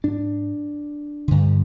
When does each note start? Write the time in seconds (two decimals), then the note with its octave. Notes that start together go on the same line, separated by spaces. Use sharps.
0.04 G#2 D4
1.28 G2 D3